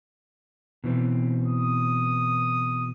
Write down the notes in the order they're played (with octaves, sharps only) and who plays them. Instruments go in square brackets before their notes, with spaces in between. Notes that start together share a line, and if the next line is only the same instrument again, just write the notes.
[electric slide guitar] B2 E3 C4
[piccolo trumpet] D#6